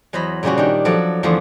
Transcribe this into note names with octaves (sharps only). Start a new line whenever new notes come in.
E2 F#3 C5 D#5 B5
A#2 C#3 G3 C#4 F#4
D#3 D4 G4
F3 F#3 A4 D5
E2 D3 F3 A3 C6